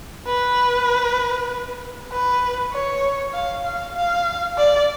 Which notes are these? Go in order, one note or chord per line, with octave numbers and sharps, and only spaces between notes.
B4
B4
C#5
F5
F5
F5
D5